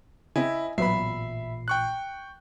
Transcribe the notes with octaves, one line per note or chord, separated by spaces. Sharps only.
C#3 C4 E4 D#5 E5 G#5
A1 A#2 F#3 B3 E5 B5 C7
G5 C#6 F#6